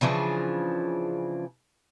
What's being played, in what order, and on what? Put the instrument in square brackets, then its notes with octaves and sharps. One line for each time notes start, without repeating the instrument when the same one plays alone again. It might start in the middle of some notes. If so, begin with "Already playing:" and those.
[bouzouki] C#3 E3 F3 D4